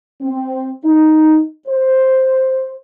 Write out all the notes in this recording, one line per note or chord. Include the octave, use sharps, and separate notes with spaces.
C4
D#4
C5